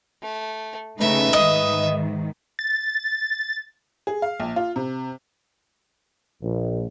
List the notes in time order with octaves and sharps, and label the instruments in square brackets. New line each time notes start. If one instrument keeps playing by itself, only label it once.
[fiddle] A3
[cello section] C#3 A3 D#4 [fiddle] B4 E5
[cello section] G#2 D#3 [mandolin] D#5
[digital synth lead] A6
[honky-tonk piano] G#4
F5
A#1
F4
C3
[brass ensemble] A#1